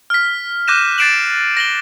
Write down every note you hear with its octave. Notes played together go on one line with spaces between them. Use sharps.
F6 B6
D6 F#6 G6 A#6 D#7 E7
F#6 A6 C7 D7 E7 F#7
A#6 F#7 G7